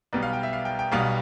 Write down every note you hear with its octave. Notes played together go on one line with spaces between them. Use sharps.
B1 B2 G3 B3 D5
F5
G5
E5
F5
G5
G5
B1 B2 G3 B3 F5